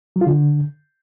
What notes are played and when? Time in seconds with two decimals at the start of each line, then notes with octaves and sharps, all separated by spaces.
0.16 F#3
0.21 F4
0.27 D3